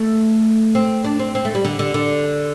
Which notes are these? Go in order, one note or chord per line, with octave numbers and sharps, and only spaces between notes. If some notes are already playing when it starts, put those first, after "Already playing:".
Already playing: A3
C4
D4
C4
C4
A3
G3
D3
D3
D3